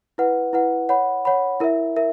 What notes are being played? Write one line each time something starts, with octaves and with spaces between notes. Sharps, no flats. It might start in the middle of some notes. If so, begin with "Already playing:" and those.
E4 B4 F#5
E4 B4 F#5
C#5 F#5 B5
C#5 F#5 B5
E4 A#4 E5
A#4 E5